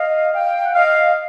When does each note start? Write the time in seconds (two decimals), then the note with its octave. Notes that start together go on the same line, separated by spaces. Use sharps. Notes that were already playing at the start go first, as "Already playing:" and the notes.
Already playing: D#5 F5
0.34 F5 G5
0.65 F#5
0.75 D#5 F5